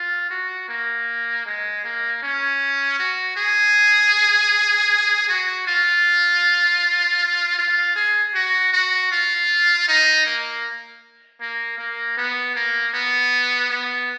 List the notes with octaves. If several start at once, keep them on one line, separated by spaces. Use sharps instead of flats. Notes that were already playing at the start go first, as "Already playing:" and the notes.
Already playing: F4
F#4
A#3
G#3
A#3
C#4
F#4
G#4
F#4
F4
F4
G#4
F#4
F#4
F4
D#4
A#3
A#3
A#3
B3
A#3
B3
B3